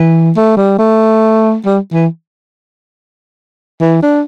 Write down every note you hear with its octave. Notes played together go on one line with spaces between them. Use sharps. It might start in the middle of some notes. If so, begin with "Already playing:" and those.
Already playing: E3
A3
G3
A3
G3
E3
E3
D4